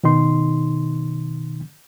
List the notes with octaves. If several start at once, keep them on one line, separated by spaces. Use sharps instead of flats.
B2 D#3 D#4 C6